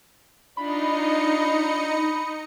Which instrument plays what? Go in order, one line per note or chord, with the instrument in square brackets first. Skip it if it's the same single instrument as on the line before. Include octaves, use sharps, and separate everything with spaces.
[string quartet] D4 F4 [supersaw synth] D#4 D#5 C#7 [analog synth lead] B5